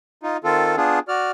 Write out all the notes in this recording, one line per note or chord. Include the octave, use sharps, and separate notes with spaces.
D#4 F4
D#3 C4 F4 A4
B3 D4 F4 G#4
F#4 D5 F6